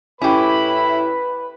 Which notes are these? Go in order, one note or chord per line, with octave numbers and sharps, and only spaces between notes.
A2 C#4 E4 G4 B4 B5